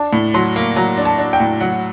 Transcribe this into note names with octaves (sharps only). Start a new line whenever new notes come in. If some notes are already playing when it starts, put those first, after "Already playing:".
Already playing: D4 A5
A2
F#3 C6
A#3
F#3 A#5
D4
A5
D4
G5
A2
F#3 F#5